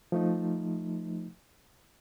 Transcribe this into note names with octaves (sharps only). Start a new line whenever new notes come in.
F3 A3 D#4